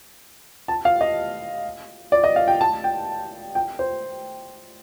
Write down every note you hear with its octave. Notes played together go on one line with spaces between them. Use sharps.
A5
F5
D#5
D5
D#5
F5
G5
A5
G5
G5
C5